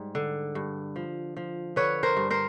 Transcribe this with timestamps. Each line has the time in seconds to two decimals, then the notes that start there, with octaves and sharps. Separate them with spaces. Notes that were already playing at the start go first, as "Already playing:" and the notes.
Already playing: G#2 G3
0.15 D3
0.55 G2
0.96 F3
1.37 F3
1.76 D3 B4 C#5
2.03 A#4 C5
2.17 G2
2.30 A#4 C5